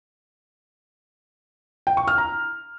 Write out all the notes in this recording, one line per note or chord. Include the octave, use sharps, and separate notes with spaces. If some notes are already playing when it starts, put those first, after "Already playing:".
G5
C#6
F6
A#5